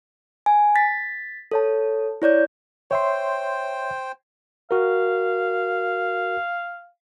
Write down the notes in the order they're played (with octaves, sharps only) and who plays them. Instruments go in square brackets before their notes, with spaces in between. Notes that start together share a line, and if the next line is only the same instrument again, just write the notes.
[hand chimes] G#5
A6 B6
A4 C#5 A5
E4 C#5 D5 G6
[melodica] C5 G5 [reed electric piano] C#5 E5 C6
[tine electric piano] F#4 A#4 [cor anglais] F5